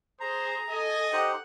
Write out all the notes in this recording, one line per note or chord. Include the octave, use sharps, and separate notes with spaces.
G#4 C5 A#5
A4 D#5 G#5 D#6
D#4 G4 C5 F#5